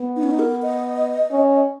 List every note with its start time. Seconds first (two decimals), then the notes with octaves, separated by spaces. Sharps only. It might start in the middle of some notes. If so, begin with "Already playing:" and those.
Already playing: B3
0.16 D#4
0.23 C#4
0.31 D#4
0.39 A#4
0.63 D#5
1.31 C#4